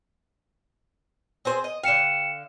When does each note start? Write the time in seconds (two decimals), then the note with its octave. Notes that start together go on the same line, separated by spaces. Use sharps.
1.45 C4 G#4 C5
1.64 D#5
1.83 D3 F5 G5 C#7 E7